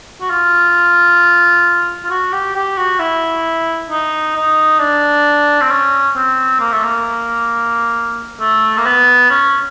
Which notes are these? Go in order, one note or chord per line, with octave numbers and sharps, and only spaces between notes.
F#4
F4
F4
F#4
G4
G4
F#4
E4
D#4
D#4
D4
C4
C#4
C4
A#3
A3
A#3
A3
A#3
B3
C#4